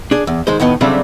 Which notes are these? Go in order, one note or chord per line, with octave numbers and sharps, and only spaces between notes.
D4 G#4
E2
D#3 G#3 G#4 C5
A2 D#3 B3 D#5
C#3 F#3 G3 A3 C4 D4